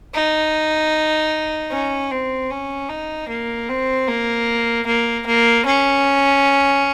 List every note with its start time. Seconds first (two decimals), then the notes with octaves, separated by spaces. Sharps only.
0.14 D#4
1.72 C#4
2.11 C4
2.50 C#4
2.89 D#4
3.29 A#3
3.69 C4
4.08 A#3
4.87 A#3
5.26 A#3
5.66 C#4